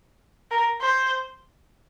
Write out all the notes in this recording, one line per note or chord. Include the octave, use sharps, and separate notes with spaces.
A#4
C5